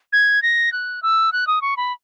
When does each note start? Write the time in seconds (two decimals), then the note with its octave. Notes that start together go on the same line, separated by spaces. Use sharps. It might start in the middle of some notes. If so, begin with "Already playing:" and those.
0.13 G#6
0.42 A#6
0.72 F#6
1.03 E6
1.33 F#6
1.47 D#6
1.62 C#6
1.77 B5